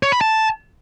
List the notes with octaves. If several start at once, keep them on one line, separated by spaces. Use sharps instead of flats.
C#5
B5
A5